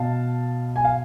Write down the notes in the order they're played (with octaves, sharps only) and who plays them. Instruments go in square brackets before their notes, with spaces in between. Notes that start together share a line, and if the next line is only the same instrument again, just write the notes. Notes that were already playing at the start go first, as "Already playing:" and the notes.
Already playing: [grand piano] B2 F5 A5
G#5
F5